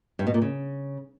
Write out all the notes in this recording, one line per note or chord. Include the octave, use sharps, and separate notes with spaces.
G2
B2
A#2
C#3